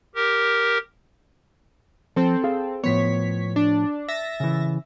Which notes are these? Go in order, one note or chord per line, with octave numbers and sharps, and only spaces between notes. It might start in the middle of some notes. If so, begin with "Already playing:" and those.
G4 A#4
F3 C4 A4
G#4 F5
A2 F3 B3 C#5 B6
D4
E5 A6 A#6
C#3 E3